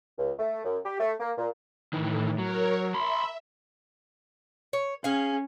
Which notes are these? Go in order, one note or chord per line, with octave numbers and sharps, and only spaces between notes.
C#2
A3
F#2
G4
A3
A#3
A#2
A2 D#3 E3
F#3 A#4 C#5
E5 B5 C6
C#5
C#4 G#4 F5